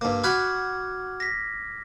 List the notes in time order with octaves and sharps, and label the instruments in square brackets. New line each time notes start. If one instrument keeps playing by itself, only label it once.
[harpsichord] G2 A#3
[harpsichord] F#4 B5 [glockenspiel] D6 F6 G#6
[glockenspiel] A#6 B6